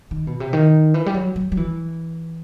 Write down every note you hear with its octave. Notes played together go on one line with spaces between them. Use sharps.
D#3
B2
C3
D#3
E3
G3
F#3
F#3
F#3
E3